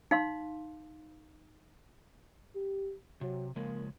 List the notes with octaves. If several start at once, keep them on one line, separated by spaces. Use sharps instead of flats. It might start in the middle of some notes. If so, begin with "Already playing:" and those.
D#4 F5 C6
G4
C3 F#3
C#3 F3 G#3 A#3